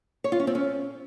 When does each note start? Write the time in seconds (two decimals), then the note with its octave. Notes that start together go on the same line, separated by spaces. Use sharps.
0.24 C#5
0.32 F4
0.40 C#4
0.47 C4
0.55 C#4